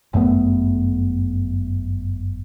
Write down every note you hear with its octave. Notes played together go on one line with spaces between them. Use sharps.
G1 F#2 A3 B3